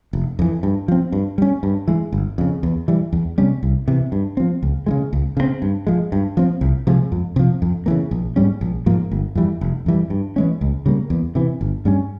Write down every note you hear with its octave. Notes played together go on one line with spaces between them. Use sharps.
F1
F2 E3
G2
F3 C4
G2
G3 C#4
G2
E3 G#3
G1
F2 C#3
E2
E3 G3
E2
C3 G3 C#4
C2
C3 E3
G2
F3 C4
C#2
C#3 E3 G#3
C#2
C#3 F3 C4
G2
F3 G#3
G2
F3 C4
C2
C3 F3 G#3
F2
C3 F3
F2
C#3 E3 A#3
A#1
G#2 G3 C#4
A#1
G#2 F3 A#3
G1
F2 E3 G3
F1
F2 E3 G3
G2
E3 G#3 C#4
C#2
C#3 G3 A#3
E2
C3 E3
G1
G2 G3 C#4